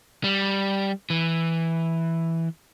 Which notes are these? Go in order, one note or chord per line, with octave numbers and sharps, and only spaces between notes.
G3
E3